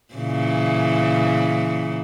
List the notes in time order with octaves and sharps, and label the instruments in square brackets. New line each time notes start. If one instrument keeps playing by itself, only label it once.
[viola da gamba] A#2 C#3 E3